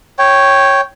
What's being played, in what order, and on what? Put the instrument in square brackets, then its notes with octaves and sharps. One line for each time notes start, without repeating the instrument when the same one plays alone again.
[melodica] C#5 G5